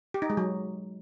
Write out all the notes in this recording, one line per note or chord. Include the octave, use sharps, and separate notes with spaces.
G4
D#4
G#3
F#3